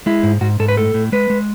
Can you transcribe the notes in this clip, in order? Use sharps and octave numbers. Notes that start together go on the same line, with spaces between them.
G#3 E4
G#2
G#2 F#4
G#2 A4
B4
A2 A4
A2
G#3 B4
G#3